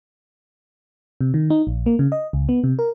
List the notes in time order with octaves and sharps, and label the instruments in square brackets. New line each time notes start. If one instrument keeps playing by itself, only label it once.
[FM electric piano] C3
D#3
D#4
A#1
A#3
C#3
D#5
C#2
B3
C3
A#4